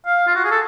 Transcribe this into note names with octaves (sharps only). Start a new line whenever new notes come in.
F5
F4
F#4
G#4
A4